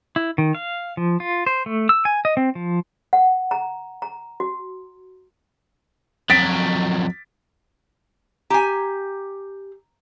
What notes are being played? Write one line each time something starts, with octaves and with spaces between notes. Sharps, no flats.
E4
D#3
F5
F3
F4
C5
A3
E6
G#5
D#5
C4
F3
F#5
A#5
A#5
F#4
F2 F#3 A6 B6 D7
G4 G#5 A#5